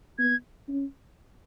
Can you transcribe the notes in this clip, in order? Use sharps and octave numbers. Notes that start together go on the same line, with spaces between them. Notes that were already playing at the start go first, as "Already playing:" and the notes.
B3 G#6
C#4